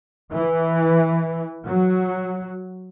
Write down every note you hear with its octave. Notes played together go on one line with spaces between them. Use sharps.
E3
F#3